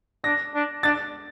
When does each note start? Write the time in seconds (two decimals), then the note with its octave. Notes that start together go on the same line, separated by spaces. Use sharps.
0.24 D4 A#6
0.54 D4
0.83 D4 A6